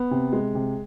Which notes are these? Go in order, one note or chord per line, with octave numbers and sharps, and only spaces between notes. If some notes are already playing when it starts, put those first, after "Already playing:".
Already playing: B3
C3
G#3
C3